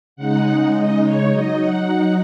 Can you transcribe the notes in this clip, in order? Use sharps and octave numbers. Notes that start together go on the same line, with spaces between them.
C#3 G#3 D#4 F#5
D#5
C#5
F#3 D#4 D#5
F#5